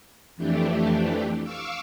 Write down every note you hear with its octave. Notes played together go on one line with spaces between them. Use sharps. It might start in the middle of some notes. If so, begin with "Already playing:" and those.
F2 E3 A3 D4 G4
F5 C#6 D6 E6